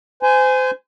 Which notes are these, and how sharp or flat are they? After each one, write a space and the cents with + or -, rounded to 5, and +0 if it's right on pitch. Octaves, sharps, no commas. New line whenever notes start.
C5 -30 G#5 +0